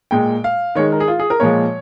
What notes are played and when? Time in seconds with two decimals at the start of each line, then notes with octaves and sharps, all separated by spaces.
0.11 A#2 G#3 G5
0.44 F5
0.75 D#3 G#3 C#5
0.92 A#4
1.00 G#4
1.08 F4
1.19 G#4
1.30 A#4
1.40 A#2 F3 G#3 C#5